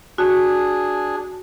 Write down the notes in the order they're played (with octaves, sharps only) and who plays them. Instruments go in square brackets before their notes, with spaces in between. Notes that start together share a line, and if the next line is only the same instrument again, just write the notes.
[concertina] D4 G#4 [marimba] F#4